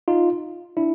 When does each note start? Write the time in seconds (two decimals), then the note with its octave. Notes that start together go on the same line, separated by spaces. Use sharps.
0.08 D#4 F4
0.77 D4 E4